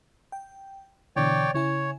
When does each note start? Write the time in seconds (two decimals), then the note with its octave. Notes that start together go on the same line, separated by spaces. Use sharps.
0.32 G5
1.16 B2 D3 E3 C#5 D5 G5
1.54 C#3 E4 C#5 G#5